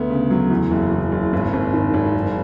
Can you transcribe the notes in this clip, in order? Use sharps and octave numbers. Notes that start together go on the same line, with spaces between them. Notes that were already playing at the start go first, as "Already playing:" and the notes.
Already playing: D2 B3
C#3
F#3
E2
F#1
E2
F#1
G#1
G#1
D#3
G#1
F#1